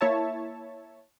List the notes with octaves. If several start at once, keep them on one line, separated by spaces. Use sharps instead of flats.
A#3 E4 C#5 E5 A5